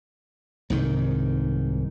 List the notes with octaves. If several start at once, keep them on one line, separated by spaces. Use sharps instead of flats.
C2 G#2 D#3